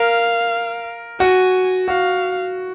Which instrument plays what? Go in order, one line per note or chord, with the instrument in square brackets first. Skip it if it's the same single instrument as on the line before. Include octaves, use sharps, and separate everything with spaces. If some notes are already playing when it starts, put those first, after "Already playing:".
Already playing: [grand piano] A#4 [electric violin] F5
[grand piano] F#4 [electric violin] G#5
[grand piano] F#4 [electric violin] F5